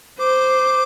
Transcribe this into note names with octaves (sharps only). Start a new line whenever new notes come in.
C5 D6